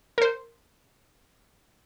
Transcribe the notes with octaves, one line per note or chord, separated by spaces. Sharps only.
A#4 C5